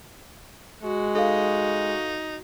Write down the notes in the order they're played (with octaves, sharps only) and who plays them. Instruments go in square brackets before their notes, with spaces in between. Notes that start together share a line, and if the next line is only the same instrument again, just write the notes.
[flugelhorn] G#3 [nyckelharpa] F#4
[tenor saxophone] D#4 [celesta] A4 F5